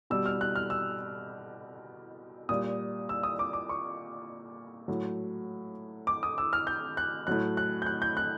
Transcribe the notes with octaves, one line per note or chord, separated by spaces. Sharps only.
B2 G3 E6
F6
F#6
F6
E6
A#2 G3 D#6
E6
D#6
D6
D6
C#6
A2 F#3
D6
D#6
E6
F6
G6
F#6
A2 F#3 F#6
F#6
G6
F#6
G6
F#6